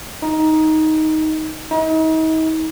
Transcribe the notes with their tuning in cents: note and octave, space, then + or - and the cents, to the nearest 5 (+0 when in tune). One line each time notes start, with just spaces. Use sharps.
D#4 +10
D#4 +40